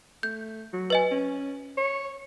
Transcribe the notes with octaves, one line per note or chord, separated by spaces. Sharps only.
A3 G6
F#3
B4 D#5 G#5
C#4
C#5